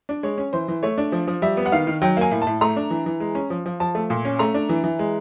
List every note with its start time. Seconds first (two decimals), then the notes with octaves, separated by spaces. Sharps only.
0.09 D4
0.23 G#3 C#5
0.38 C#4
0.53 E3 C5
0.68 E3
0.83 A3 C#5
0.98 D4
1.12 F3
1.27 F3
1.42 G3 E5
1.57 B3
1.66 F#5
1.72 D#3 F5
1.87 D#3
2.02 F#3 G5
2.17 A#3 G#5
2.31 A2
2.42 A5
2.47 A2
2.61 A3 A#5
2.76 D4
2.91 E3
3.06 E3
3.20 G#3
3.35 C#4
3.50 F3
3.66 F3
3.80 F3 A5
3.95 A3
4.10 A#2
4.25 C#4
4.39 A3 A#5
4.54 D4
4.69 E3
4.84 E3
4.99 G#3